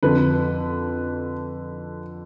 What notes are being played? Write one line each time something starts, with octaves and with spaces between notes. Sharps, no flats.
F2 D3 B4